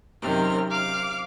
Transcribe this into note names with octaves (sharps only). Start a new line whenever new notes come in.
F#2 C3 D#3 F6
F5 D6 F6